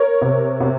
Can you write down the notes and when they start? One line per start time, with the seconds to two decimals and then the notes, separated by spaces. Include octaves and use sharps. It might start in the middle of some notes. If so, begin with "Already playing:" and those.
Already playing: A#4 C#5
0.22 C3
0.60 C3